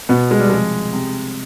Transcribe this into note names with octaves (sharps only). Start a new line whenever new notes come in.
B2 B3
G#3
G3
C3 F3 G#3
C3